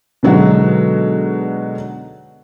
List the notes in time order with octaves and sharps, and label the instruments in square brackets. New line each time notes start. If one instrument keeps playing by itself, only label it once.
[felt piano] B2 D3 F#3 G#3 D#4 F#4